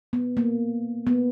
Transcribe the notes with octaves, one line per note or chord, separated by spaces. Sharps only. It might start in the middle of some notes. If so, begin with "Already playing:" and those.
B3
A#3
B3